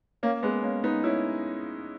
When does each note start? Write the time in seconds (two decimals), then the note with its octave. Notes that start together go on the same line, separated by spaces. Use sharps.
0.23 A#3 C#4
0.43 G#3 B3
0.63 A#3 C#4
0.84 B3 D#4
1.04 C#4 E4